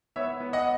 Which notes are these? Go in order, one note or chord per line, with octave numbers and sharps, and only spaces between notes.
B3 C#5 E5
B3
D#5 F#5